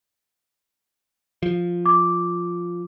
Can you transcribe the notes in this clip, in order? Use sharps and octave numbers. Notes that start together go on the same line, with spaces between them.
F3
D6